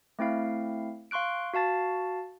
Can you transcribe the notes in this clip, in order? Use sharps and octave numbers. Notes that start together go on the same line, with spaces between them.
A3 C4 E4 F5
F5 C6 C#6 F#6 D7
F#4 F5 A5 A6